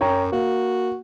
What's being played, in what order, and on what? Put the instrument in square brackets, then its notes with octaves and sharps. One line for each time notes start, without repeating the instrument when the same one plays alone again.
[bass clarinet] F#2 [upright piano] C#5 G5 A#5
[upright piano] A#3 [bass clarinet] F#4